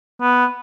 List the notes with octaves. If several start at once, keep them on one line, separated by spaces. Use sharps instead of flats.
B3